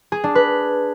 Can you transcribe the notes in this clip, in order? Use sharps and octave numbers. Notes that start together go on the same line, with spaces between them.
G#4
D4
B4